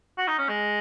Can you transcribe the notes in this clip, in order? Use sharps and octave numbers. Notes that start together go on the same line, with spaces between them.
F#4
D#4
C#4
G#3